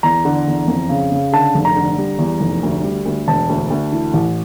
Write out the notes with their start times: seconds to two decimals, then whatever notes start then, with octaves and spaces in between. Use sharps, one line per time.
0.03 E2 A#5
0.25 D3
0.47 E2
0.68 F2
0.89 C#3
1.12 C#3
1.32 D3 A5
1.55 F1
1.65 A#5
1.76 D3
1.98 G3
2.19 E2
2.40 F1
2.63 D2
2.84 G3
3.05 D2
3.28 E1 A5
3.49 D2
3.70 D2
3.92 E3
4.14 A1